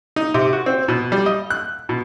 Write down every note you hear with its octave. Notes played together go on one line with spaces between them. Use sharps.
D#4
C3
F#4
C4
B2
G3
D#5
F#6
B2